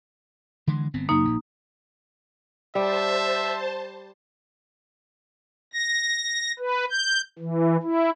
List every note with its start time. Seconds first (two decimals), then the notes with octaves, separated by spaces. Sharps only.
0.67 D3 E3 G#3
0.94 G1 B3 C4
1.09 F#2 C#3 A#3 D#4
1.25 A#1
2.75 G3 C5 E5 A5
5.73 A#6
6.59 B4
6.90 G6
7.39 E3
7.83 E4